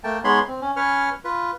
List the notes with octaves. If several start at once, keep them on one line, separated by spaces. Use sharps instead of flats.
A3 A#3 G5 A5
G#3 B3 D#4 C#5 B5 C6
C4
C#4
C#4 B4 C#5 C#6 F6
F4 B4